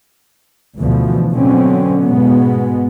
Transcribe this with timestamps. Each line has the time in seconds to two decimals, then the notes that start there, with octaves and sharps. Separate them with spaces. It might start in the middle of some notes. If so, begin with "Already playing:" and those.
0.78 D2 B2 E3 F3
1.34 B2 D3 F#3 C4 C#4
2.04 G#2 B2 G#3 B3